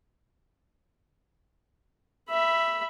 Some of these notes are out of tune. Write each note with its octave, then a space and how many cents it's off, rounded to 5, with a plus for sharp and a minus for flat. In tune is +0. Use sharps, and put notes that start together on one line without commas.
E5 +10 B5 +0